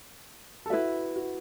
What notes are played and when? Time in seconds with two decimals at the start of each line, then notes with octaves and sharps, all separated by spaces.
0.66 A4
0.70 E4 F#4 B4 E5
1.16 F#4